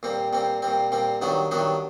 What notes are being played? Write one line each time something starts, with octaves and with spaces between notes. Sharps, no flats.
A#2 G3 C4
A#2 G3 C4
A#2 G3 C4
A#2 G3 C4
G2 D#3 F#3 B3 D4
G2 D#3 F#3 B3 D4